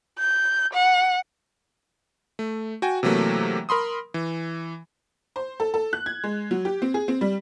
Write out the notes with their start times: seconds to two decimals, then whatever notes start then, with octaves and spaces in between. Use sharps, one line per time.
0.19 G6
0.74 F#5
2.39 A3
2.82 F#4 G5 G#5
3.03 C3 E3 F#3 A3 A#3
3.69 A#4 B5 C6 D#6
4.14 E3
5.36 C5
5.60 A4
5.74 A4
5.93 F#6
6.06 G#6
6.24 G#3
6.51 F#3
6.65 G4
6.82 C4
6.94 G#4
7.08 C4
7.21 G3